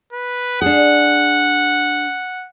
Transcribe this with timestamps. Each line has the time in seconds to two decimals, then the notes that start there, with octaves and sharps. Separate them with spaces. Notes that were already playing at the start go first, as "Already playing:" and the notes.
0.13 B4
0.62 D4 G#4 F#5